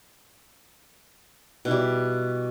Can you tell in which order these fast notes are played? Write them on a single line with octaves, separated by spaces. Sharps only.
B2 E3 G3